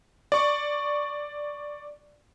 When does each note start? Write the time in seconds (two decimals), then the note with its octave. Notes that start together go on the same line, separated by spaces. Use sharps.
0.32 D5 C#6